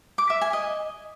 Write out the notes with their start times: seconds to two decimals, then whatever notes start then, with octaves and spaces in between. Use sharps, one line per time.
0.18 D6
0.30 E5
0.41 G#5
0.53 D#5